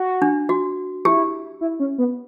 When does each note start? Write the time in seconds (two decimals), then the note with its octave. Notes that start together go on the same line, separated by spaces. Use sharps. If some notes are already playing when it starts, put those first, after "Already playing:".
Already playing: F#4
0.22 D4
0.49 F#4
1.05 E4 G4
1.61 E4
1.80 C#4
1.98 B3